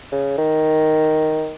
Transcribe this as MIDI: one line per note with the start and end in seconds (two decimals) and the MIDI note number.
0.12 0.37 49
0.38 1.54 51